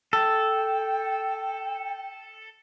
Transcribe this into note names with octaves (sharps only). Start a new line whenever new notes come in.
A4 G5